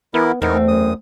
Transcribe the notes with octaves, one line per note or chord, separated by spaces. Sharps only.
E3 B3 E4 A#4
E2 A3 B3 C4 D#4 A#4
F#2 D#6